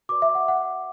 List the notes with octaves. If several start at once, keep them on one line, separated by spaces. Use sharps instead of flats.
F#4 B4 D5 D6
E5
F#5
F#5